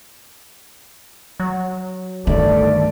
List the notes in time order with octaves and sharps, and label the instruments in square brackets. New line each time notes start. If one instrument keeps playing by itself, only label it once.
[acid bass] F#3
[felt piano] G1 [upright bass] D#3 [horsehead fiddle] A3 D5